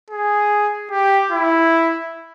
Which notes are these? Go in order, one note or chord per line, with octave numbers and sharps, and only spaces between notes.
G#4
G4
E4